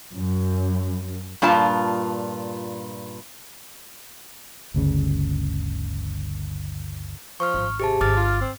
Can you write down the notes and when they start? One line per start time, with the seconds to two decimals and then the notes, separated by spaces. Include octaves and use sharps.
0.14 F#2
1.42 G2 A#2 F4 A5
4.74 G1 D2 C#3
7.40 F3 C#6 F6
7.54 G#1
7.80 C3 G4 G#4 A5
8.01 G1 D6 F6 A6
8.16 F4
8.41 C4